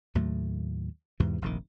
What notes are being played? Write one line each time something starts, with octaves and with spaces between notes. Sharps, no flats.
D#2 A2 F#3 A3
E2 G#2 C3 E3
F1 A#1 C3 D#3